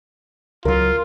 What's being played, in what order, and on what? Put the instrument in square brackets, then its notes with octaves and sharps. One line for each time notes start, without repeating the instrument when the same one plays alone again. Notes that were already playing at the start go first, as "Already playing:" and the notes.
[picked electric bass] C#2 F#3 [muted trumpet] F4 [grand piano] A#4